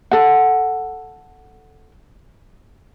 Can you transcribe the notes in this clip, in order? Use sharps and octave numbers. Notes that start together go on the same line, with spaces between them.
A4 F#5